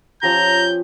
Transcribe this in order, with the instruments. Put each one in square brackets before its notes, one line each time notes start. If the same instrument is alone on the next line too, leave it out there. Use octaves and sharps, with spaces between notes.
[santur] F3 C#4 G4 [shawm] A#5 [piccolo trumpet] G6